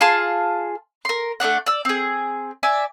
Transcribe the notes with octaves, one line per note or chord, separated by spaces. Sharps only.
F4 G#4 A5 C6
A#4 C6
A3 D4 D5 F#5
D5 E6
C4 G#4
D5 E5 G#5